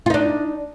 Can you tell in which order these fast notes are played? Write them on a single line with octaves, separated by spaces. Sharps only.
F4 D#4 D4